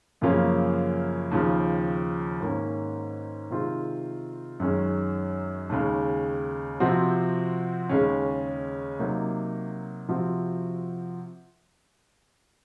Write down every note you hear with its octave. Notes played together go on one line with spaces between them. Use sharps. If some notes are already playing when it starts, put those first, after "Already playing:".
F#2 C#3 F3 A#3 C#4
D#2 C#3 F3
G#2 D#3 A#3 C#4
C3 D#3 G#3 C4 F4
F#2 D#3 G#3 C#4
D#2 C#3 G#3
C3 F3 C4 F#4
D#2 C#3 G#3 C#4
C3 F#3 A#3 D#4
C3 F3 C4 F#4